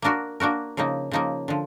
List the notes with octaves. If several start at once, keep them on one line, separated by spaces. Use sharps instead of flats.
A#3 D4 F#4 A#4
A#3 D4 F#4 A#4
C#3 F3 A#3 D#4
C#3 F3 A#3 D#4
D3 F3